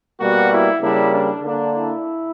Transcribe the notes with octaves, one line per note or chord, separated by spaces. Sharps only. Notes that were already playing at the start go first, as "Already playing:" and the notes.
B2 G3 A#3 F#4
E4
C#3 G3 A#3 D4 E4
D4
D3 A#3 D4
E4